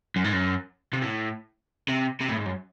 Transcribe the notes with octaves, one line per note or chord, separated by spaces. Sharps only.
F#2
G#2
F#2
C3
A2
C3
C3
A2
G#2
F#2